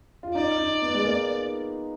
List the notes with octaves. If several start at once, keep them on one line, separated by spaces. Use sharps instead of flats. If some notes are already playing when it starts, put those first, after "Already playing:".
F4
D#4 D5
D#4
B3
G#3
A#3